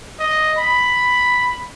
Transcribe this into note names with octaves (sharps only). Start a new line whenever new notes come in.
D#5
B5